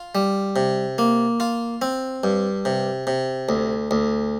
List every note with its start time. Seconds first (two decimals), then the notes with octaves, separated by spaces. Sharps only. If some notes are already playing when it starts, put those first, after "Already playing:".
Already playing: F4
0.15 G3
0.56 C3
0.98 A#3
1.40 F4
1.82 C4
2.24 G2
2.65 C3
3.07 C3
3.49 D2
3.91 D2